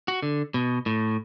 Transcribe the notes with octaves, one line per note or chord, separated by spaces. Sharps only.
F#4
D3
B2
A2